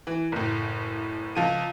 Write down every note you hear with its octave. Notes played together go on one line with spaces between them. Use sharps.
E3
F#1 A2
C#2 F3 D#7